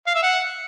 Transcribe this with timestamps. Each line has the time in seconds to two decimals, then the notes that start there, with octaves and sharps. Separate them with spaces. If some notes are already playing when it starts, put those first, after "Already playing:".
0.07 F5
0.15 E5
0.23 F#5